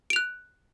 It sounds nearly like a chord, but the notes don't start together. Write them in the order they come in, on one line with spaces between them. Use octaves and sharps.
D7 F7 F#6